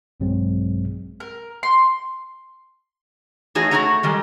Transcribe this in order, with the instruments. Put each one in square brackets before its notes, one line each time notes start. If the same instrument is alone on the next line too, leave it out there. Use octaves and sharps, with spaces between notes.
[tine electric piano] A#1 G2 B2 F#3 G#3 C4
[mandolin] A#4
C6
[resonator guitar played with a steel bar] E3 A3 D#4 F#4 G#4 C#5
A3 F#4 A4 C#5 F#5 A#5
D#3 G3 G#3